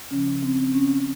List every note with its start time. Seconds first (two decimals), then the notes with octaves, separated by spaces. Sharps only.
0.11 C#3 F3 C#4
0.43 C4
0.74 C#4